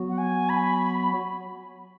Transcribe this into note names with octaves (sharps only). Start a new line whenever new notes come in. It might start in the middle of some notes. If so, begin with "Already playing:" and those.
Already playing: F#3 B3 F#4
F#5
G#5
B5